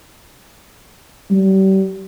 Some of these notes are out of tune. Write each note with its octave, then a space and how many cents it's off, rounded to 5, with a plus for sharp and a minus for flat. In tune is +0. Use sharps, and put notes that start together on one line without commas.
G3 -35